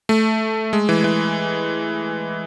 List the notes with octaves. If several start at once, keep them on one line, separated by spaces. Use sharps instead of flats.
A3
G#3
E3
E3